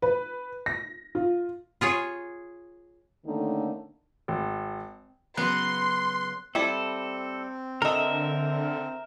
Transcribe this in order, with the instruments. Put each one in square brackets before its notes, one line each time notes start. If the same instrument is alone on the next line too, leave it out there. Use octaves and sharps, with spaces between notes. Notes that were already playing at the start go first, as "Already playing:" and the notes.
[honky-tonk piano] B4
A#6
F4
[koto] F4 G#4 C#5
[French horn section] D3 D#3 A3 A#3 C#4 D#4
[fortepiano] G#1
[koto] C#3 F#3 B3 [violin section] C6 [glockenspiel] F#6
[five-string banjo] G3 E4 A5 [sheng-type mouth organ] C4 [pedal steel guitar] A4
[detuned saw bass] D3 [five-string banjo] A4 D#5 [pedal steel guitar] A#4 E5